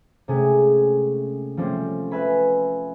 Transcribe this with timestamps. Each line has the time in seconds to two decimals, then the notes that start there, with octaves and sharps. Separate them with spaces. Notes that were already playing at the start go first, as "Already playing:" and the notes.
0.28 C3 G#3 A3 C#4 G#4
1.57 F3 G3 A3 C4 C#4
2.11 B4 E5 G#5 B5